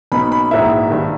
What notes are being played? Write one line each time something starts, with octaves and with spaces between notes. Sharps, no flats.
B1 B2 A#3 D#4 B5
B5
A#1 G#2 E3 A#3 E5
G2 D#3